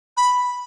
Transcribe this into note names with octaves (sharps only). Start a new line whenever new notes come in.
B5